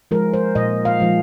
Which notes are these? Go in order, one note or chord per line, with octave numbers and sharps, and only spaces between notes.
F3 G#3 A#4
C5
A#2 D#5
F5
F3 G#3